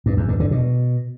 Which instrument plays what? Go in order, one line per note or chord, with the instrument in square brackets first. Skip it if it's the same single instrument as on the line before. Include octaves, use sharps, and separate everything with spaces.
[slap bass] G2
E2
G2
D3
B2